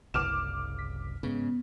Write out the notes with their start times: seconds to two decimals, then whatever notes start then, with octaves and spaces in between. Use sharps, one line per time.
0.14 F#1 C2 D6 F6 E7
0.79 B6
1.23 G#2 C#3 B3